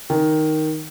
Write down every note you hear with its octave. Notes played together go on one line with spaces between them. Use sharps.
D#3